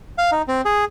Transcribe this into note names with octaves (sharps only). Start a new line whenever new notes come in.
F5
D#4
C4
G#4